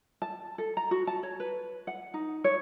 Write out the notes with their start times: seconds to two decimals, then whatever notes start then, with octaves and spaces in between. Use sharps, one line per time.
0.22 A5
0.58 A4
0.77 A#5
0.91 F#4
1.07 A5
1.23 C#5
1.40 B4
1.87 F#5
2.14 D#4
2.44 C#5